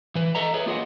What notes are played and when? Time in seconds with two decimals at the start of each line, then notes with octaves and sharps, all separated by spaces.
0.15 E3 B4
0.35 A4 D#5 E5 A#5
0.54 G#4 B4 C#5
0.66 A#3 F4 G#4 D#5 F#5